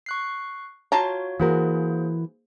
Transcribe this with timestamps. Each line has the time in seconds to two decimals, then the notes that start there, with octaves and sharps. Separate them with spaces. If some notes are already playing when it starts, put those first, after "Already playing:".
0.06 C#6 F#6 C7
0.92 F4 F#4 C#5 A5 A#5
1.40 E3 A#3 F#4 G#4 A#4 C5